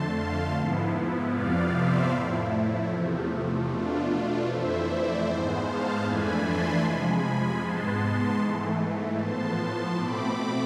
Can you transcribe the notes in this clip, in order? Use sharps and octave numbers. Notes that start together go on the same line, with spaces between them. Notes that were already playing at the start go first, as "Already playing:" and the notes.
Already playing: F2 D3 A3 A5 C6
F5 A5
G#2 F3 B3 E4
F2 C3 F3 B3 D5 F5
C5 E5
A2 F3 A3 E4
E2 C3 F3 A3
B2 A3 D4 F4
F2 E3 A3 E4 C5 E5
D5
G#2 G#3 B3 C5
F5 A5
F2 E3 A3 D4 G#5 B5
A5 C6
C3 F3 G#3 G#5 B5
G#5 B5
G#2 G#3 B3 A5 C6
G#2 E3 A3
A2 F3 B3 A5 C6
B2 A3 C4 B5 D6